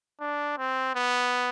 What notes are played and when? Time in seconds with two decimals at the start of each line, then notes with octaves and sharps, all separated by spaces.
0.21 D4
0.58 C4
0.96 B3